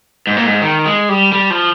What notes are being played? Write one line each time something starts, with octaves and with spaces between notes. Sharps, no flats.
G#2
A#2
G#2
D#3
G#3
G3
G3
F3